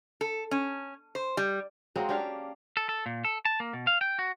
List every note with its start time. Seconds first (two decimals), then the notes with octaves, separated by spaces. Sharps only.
0.21 A4
0.51 C#4
1.15 C5
1.37 G3
1.96 F#3 G#3 A#3 C4
2.09 C#4 D4 G4 F5
2.77 A4
2.89 A4
3.06 A#2
3.25 A4
3.45 A5
3.60 A#3
3.73 B2
3.87 F5
4.01 G5
4.19 F#4